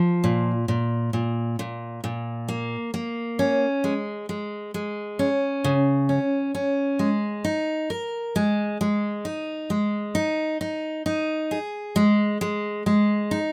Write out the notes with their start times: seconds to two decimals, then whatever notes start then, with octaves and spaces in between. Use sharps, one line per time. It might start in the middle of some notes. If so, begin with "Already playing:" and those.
Already playing: F3
0.24 A#2
0.68 A#2
1.13 A#2
1.59 A#2
2.04 A#2
2.48 A#3
2.94 A#3
3.39 C#4
3.84 G#3
4.29 G#3
4.74 G#3
5.19 C#4
5.64 C#3
6.09 C#4
6.55 C#4
6.99 G#3
7.44 D#4
7.90 A#4
8.36 G#3
8.81 G#3
9.25 D#4
9.70 G#3
10.15 D#4
10.61 D#4
11.06 D#4
11.51 G#4
11.96 G#3
12.41 G#3
12.86 G#3
13.31 D#4